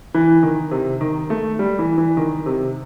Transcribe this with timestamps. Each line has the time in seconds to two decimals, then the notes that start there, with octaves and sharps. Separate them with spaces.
0.14 E3
0.43 D#3
0.71 C3
1.01 D#3
1.30 A3
1.59 G3
1.79 E3
1.98 E3
2.17 D#3
2.46 C3